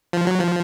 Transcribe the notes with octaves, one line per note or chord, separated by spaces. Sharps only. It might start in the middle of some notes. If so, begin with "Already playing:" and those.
F3
F#3
F3